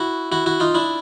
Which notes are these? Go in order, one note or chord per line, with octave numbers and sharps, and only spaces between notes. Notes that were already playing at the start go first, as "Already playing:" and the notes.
Already playing: E4 F#4
E4 F#4
E4 F#4
D#4 F4
D4 E4